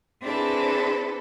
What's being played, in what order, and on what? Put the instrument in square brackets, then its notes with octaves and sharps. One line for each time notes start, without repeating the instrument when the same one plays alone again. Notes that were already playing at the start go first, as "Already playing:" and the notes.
[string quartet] C4 D4 E4 G#4 A4 B4